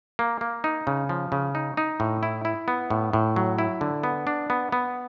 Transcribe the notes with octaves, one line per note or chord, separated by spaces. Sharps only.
A#3
A#3
D#4
C#3
F3
C#3
D#4
D#4
A2
E4
E4
B3
A2
A2
F#3
E4
D3
B3
D4
B3
B3